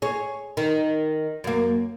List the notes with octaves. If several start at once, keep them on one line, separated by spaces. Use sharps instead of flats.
G#4 C#5
D#3
F#2 A#3